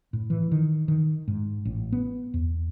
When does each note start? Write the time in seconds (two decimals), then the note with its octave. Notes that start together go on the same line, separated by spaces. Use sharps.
0.13 A2
0.30 E3
0.51 D#3
0.88 D#3
1.28 G#2
1.65 A1
1.92 B3
2.34 E2